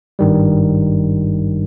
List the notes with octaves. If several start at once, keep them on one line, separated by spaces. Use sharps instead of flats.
G#1 G2 D#3 G3